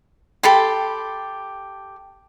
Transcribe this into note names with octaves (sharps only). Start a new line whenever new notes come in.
G4 A4 B5 C6